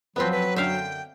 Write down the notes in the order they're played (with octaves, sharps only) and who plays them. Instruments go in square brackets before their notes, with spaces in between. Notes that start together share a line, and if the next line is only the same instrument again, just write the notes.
[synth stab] F2 F3 A5 [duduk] F#3 [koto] B3 C4 [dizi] B4
[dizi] B4
[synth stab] F#2 D3 G6 [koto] E5 F5 [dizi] G5